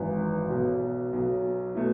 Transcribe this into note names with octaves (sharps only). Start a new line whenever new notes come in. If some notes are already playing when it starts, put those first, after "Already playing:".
Already playing: G#1 F#2 E3 E5
B1 B2 F#3
B1 B2 F#3
B2 A3 E4